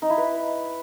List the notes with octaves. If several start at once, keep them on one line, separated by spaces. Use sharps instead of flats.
D#4
E4
B4